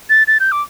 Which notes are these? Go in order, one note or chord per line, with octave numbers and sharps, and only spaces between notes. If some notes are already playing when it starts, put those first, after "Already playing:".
A6
A6
G6
D6